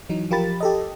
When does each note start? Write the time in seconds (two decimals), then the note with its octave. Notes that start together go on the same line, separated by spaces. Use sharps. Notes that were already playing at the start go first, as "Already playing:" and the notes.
0.09 E3 F#3 D#4
0.31 F3 F4 G4 A#4 B5 A6
0.61 G4 A4 D#5